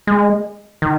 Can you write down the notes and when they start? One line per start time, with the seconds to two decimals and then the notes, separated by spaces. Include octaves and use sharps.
0.07 G#3
0.82 D#3